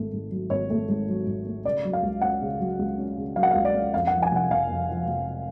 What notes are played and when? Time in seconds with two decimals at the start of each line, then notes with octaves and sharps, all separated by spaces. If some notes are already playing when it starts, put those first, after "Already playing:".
Already playing: G#1 A3
0.13 G#2
0.31 F#3
0.50 G#1 C#5
0.70 A3
0.88 G#2
1.08 F#3
1.26 G#1
1.45 A3
1.65 C#3 D5
1.84 F#3
1.93 F5
2.03 C#2
2.21 C#4 F#5
2.42 C#3
2.60 F#3
2.79 C#2
2.98 C#4
3.17 C#3
3.36 F#3 F5
3.43 F#5
3.51 F5
3.55 C#2
3.65 D5
3.74 C#4
3.94 F2 F5
4.07 F#5
4.13 F3
4.22 G#5
4.32 F1 F#5
4.50 F1 F5
4.69 F2
4.89 F3
5.08 F1